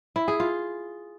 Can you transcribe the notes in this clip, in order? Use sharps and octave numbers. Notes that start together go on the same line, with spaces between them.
E4
G#4
F4